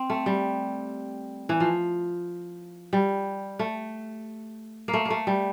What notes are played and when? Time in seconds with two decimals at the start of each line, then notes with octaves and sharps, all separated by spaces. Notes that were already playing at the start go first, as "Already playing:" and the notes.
Already playing: C4
0.10 A3
0.26 G3
1.49 E3
1.60 F3
2.93 G3
3.59 A3
4.88 A#3
4.93 A3
5.05 A3 A#3
5.27 G3